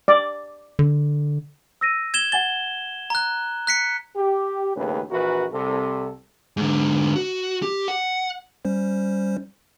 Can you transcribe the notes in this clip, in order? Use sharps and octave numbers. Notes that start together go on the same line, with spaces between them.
D5
D3
E6 A#6 D#7
G#6 E7 G7
F#5 G#5 A6 G7
A#5 F#6
F#6 B6 C#7
G4
A#1 D#2 A2 C#3 C#4 B4
A#1 A#2 E3 F#4 A#4 B4
C2 C3 A4
G#2 D3
F#4
G4
F#5
G3 C#4 C5